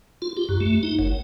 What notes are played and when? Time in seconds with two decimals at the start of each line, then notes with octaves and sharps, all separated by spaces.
0.22 F4
0.37 G4
0.49 F#2
0.60 A3
0.83 D#4
0.99 F#1